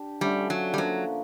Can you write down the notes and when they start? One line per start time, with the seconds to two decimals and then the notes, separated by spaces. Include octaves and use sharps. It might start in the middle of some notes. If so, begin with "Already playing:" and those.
Already playing: D4 G4
0.21 D3 F3 G3 A3 C#4
0.50 F#3
0.74 G3
0.77 F3 F#3 A#3 D4